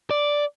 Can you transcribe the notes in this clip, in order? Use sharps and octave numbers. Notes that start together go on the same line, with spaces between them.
D5